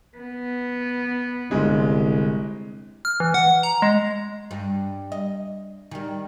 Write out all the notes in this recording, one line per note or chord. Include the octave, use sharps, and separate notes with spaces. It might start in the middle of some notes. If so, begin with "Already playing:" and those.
B3
G1 C2 G#3
F6
E3
F#5
A#5
G#3
G2
D#5
D#3 G3